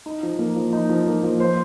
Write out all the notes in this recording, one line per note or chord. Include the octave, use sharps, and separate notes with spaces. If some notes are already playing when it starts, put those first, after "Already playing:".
D#4
F3
A#3
F3
D#4
F3
A#3
F3
C5